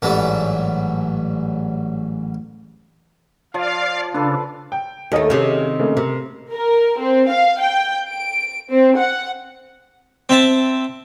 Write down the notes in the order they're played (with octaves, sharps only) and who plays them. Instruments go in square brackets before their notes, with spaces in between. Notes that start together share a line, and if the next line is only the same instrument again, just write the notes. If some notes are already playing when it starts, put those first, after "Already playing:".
[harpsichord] A1 G#2 F#3 G3 A4
[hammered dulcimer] F3 [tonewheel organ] D5 [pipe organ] F5
[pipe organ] C#3 [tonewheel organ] D4 [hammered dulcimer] A4 B4
[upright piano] G5
[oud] D#2 A3 [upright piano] A#4 C#5 D#5
[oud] C3 D#3 [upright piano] C#4 G#4 C#5
[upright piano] C#3 A3 A#3
[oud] C3 [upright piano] A#4
[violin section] A#4
C4
F5
G5
D7
C4
F#5
[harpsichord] C4 E5 A5